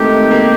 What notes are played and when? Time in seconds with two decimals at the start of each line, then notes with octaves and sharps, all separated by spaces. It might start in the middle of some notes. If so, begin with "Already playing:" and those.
Already playing: D#3 G#3 A3 C4 D#4 G4
0.31 A#3